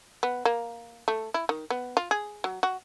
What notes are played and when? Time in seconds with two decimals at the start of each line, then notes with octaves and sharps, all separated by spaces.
0.23 B3
0.45 A#3
1.08 A3
1.34 E4
1.49 D#3
1.70 B3
1.97 F4
2.11 G#4
2.44 F#3
2.63 F#4